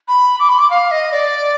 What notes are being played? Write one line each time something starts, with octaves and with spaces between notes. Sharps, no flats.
B5
D6
B5
D6
F5
D#5
D5